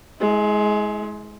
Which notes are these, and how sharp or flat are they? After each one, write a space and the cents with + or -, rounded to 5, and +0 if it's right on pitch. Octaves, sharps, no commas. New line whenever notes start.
G#3 +20 E4 -30